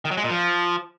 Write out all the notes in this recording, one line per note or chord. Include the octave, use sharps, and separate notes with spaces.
D#3
F#3
G#3
A#2
F3